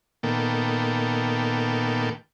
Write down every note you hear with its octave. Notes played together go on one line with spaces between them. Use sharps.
A#2 D#3 A#3 B3 A4 G5